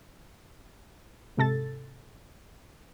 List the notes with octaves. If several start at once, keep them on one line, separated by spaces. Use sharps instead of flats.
G#2 C3 A4 A6